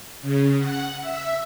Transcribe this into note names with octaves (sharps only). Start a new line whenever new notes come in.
C#3
F#5
E5